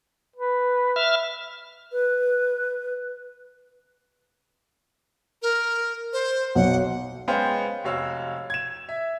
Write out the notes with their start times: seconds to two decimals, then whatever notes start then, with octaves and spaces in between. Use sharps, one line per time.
0.36 B4
0.96 E5 F6
1.92 B4
5.42 A#4
6.13 C5
6.55 B1 F#5
7.28 G#3 B3 C#4 C5 F5 G5
7.84 F1 F#4 C#5 F5 E6
8.50 G#6 E7
8.89 E5